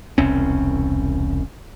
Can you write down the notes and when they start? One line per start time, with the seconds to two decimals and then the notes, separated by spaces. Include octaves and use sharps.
0.18 E1 C2 C4 C#4